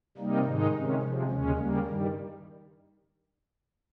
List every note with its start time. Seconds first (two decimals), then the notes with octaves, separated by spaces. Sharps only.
0.17 C3 G3 A#3 D#4
0.44 G#2 D#3 G#3 D#4
0.72 C3 D#3 G#3 C#4
1.01 C3 F3 G#3
1.28 D#2 C#3 G#3 C#4
1.56 C#3 G3 A#3
1.85 G2 D#3 G3